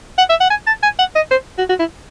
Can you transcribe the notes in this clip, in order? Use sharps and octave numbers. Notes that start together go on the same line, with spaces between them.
F#5
E5
F#5
G#5
A5
G#5
F#5
D#5
C5
F#4
F#4
E4